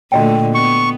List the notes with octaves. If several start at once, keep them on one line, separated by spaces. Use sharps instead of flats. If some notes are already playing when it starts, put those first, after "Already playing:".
A#2 D3 A3 F#4 D#5 G5
B3 C#6